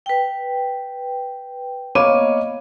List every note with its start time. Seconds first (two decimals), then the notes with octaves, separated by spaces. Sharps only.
0.06 B4 G5
1.95 A#3 B3 C#5 D#5 F5 D6